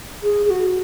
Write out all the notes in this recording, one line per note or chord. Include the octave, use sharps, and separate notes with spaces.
G#4
G#4
F#4